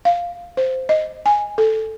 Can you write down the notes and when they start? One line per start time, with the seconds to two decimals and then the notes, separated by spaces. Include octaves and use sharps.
0.05 F5
0.57 C5
0.89 D#5
1.26 G#5
1.58 A4